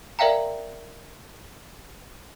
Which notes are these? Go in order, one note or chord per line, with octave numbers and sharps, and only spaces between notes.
A#4 D5 E5 F5 G5 A#5